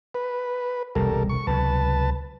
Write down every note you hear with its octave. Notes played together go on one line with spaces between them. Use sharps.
B4
E1 C2 G3 A4 A#4
C#6
C#2 C3 F#3 B4 A5